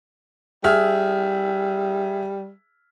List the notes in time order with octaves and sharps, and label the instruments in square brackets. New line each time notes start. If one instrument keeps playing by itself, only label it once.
[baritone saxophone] G3 [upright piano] G#4 E5 F6